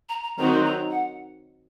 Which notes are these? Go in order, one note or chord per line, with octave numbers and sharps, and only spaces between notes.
A#5
A#5
D#3 F#3 C4 D#4 F#4 A#5
C6
A#5
F#5